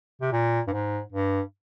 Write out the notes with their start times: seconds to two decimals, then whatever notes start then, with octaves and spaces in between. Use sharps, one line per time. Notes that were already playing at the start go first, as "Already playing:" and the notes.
0.21 C3
0.32 A#2
0.67 G2
0.72 G#2
1.12 G2